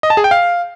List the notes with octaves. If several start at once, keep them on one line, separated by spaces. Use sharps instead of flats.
D#5
A5
G#4
G5
F5